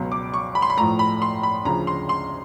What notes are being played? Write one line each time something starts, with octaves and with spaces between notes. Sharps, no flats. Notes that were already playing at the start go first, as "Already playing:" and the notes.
Already playing: C#2 B2 F#3
D6
C#6
B5
C6
B5
A2 F3 A3 A#5
B5
C6
B5
D2 C#3 F3 A#5
C6
C6